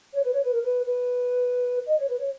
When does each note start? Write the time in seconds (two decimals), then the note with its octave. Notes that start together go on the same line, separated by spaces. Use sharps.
0.13 C#5
0.22 B4
0.32 C#5
0.42 B4
0.52 A#4
0.63 B4
0.84 B4
1.86 D#5
1.97 C#5
2.07 B4
2.18 C#5